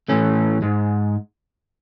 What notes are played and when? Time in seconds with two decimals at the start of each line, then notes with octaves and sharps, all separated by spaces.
0.08 A2 E3 A3 C#4
0.62 G#2 G#3